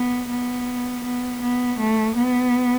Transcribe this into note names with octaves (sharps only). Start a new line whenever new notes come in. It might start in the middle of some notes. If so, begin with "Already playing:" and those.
Already playing: B3
B3
B3
B3
A3
B3